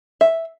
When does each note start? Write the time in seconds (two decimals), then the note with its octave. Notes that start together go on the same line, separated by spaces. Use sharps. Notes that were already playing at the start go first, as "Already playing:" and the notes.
0.21 E5